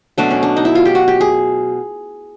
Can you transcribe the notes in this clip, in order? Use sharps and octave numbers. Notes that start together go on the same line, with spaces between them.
B2 F#3 A3 D4
C#4
D4
D#4
E4
F4
G4
F#4
G4
G#4